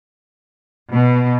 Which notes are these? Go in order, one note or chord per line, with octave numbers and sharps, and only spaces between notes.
B2